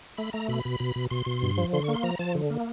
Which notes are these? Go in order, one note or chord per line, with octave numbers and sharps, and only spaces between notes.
A3 B5
A3 A#5
B2 B5
B2
B2
B2
B2 C6
B2
G2
F3
D3 C6
C#6
A#3
C6
F3 A#5
F3 A5
D3
A#3